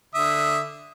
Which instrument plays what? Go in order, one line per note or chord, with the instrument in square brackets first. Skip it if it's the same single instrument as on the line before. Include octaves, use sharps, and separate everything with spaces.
[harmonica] D3 E5 D#6